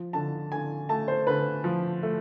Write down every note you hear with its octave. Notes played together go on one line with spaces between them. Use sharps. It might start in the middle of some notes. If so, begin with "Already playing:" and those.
Already playing: F3
D3 A5
D3 G#5
A3 A5
C5
D3 B4
F3
A3